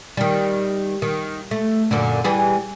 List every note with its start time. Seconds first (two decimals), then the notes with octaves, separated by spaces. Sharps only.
0.17 D#3 G3
1.02 D#3
1.51 A3
1.91 F#2 A#2 D3
2.24 E3 G3 G#4